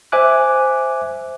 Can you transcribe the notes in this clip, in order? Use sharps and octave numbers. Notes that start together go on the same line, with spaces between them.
C5 E5 G#5 D6 F#6